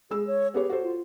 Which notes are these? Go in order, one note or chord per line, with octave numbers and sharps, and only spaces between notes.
G#3 G#4 E6
C#5
B3 G4 G#4 C#5
F#4 A4 C5
F4